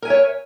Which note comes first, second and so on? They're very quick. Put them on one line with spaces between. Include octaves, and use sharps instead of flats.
A#4 G#5 E5 C#5